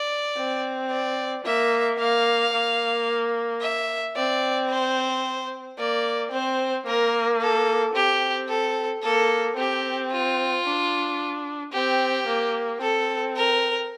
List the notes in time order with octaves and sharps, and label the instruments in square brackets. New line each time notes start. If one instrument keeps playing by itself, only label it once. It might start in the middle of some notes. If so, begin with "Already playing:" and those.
Already playing: [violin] D5
[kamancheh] C4
[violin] D5
[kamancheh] A#3 [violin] E5
[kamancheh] A#3 [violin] F5
[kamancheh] A#3
[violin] E5
[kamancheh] C4 [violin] D5
[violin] C5
[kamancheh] A#3 [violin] D5
[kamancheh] C4 [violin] C5
[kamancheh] A#3 [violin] A#4
[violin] A4
[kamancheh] C4 [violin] G4
[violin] A4
[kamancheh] A#3 [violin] A4
[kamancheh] C4 [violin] G4
[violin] F4
[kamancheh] D4
[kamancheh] C4 [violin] G4
[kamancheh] A#3
[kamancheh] C4 [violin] A4
[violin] A#4